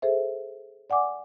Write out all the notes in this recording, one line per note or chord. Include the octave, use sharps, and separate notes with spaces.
G#4 A4 C5 E5
D5 F#5 G#5 D6